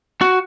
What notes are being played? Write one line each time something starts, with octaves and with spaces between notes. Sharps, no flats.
F#4